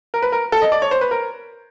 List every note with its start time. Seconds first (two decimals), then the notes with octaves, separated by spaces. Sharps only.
0.14 A#4
0.22 B4
0.32 A#4
0.52 A4
0.62 D#5
0.72 D5
0.82 C#5
0.91 C5
1.01 B4
1.11 A#4